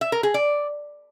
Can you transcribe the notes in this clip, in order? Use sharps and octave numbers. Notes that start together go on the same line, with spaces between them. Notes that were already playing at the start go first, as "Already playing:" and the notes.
E5
A#4
G#4
D5